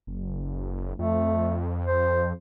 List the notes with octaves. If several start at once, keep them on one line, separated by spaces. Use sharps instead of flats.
F#1
F2 A3
C5